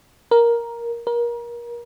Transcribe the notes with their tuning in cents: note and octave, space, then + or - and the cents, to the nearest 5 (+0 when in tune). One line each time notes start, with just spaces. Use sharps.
A#4 +10
A#4 +30